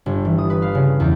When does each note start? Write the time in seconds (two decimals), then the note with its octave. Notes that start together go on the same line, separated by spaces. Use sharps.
0.06 G1
0.25 E3
0.38 D#6
0.50 B4
0.62 F5
0.75 C#3
1.00 E2